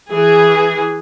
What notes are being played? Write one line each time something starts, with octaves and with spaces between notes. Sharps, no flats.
E3 G#4